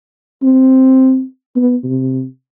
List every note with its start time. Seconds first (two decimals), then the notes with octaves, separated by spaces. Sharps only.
0.43 C4
1.56 B3
1.84 C3